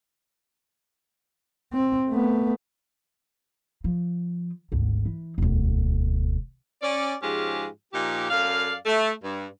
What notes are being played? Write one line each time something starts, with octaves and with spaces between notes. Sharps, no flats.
C4
A3 B3
F3
G#1 D2
E3
E1 D2
C#4 D5
G#2 F3 G#3 C#4 F4 G4
A#2 F3 D#4 G4
F#2 A4 D5 F5
A3
G2